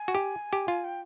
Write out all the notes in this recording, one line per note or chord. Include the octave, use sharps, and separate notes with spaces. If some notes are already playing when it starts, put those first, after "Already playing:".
Already playing: G#5
F#4
G4
G4
F4
G5